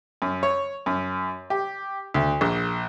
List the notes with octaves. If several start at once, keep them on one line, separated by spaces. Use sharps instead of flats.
F#2
C#5
F#2
G4
D2
A#1